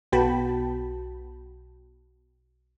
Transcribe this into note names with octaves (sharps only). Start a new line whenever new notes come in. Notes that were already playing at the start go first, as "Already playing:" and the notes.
B1 B3 F#4 G5 A5 B5